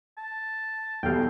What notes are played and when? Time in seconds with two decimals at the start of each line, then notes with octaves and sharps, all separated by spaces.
0.18 A5
1.03 B1 E2 G3 A4 F5 G5